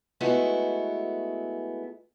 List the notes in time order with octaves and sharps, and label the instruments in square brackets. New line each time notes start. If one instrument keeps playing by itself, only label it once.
[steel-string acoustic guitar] G#3 A3 B3 E4 F#4